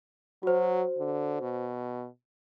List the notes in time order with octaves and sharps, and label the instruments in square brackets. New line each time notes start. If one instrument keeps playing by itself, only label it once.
[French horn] F#3 [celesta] F#4 C5
[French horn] D3
B2